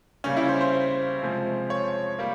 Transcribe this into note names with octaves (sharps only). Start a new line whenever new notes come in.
C#3 G3 A#3 C#4
E4
C5
C5
C5
C3 F3 G#3
C#5
G3 A#3